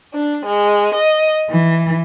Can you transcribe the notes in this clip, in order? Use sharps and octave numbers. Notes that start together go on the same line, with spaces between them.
D4
G#3
D#5
E3